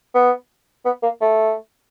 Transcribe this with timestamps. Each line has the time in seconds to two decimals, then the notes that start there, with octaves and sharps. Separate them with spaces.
0.14 B3
0.85 B3
1.03 A#3
1.21 A3